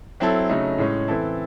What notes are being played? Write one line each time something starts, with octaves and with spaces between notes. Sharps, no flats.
F#3 C4 E4 A4
C#3 F#3 A3 D#4
A2 G#3 C#4
E3 C4 E4 A4